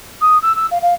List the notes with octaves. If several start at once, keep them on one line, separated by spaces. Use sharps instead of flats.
D#6
E6
E6
F5
F5